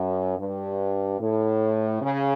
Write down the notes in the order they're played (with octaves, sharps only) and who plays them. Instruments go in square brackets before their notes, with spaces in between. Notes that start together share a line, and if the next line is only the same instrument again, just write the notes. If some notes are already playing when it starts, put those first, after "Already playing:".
Already playing: [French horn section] F#2
G2
A2
C#3